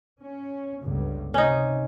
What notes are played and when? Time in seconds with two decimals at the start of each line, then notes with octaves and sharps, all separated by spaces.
0.22 C#4
0.82 G1 C#2 G2
1.34 C3 C#4 D#4